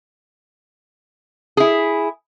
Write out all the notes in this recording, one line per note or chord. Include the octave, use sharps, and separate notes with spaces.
E4 G#4